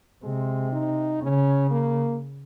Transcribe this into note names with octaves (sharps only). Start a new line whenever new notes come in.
C3 G#3
D#4
C#3 C#4
A#3